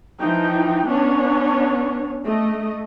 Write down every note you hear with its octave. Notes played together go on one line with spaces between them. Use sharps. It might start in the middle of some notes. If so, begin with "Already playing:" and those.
E3 F3 D#4 G5
B3 C#4 D4 C#5
A3 D#5